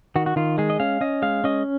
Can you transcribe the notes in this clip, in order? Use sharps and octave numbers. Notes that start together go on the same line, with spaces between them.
D#3 F#4
F#4
D#3 F4
G#3 G#4
D#5
C#4 F5
C#4 D#5
G#3 F5
C#4 D#5